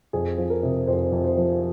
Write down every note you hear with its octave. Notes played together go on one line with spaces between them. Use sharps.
F2 G#4
F3
A#4
C3
F2 C5
F2
C5
F3